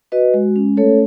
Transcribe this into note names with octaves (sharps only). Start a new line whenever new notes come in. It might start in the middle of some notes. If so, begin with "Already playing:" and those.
F#4 B4 D#5
G#3
C#4
A3 A4 C#5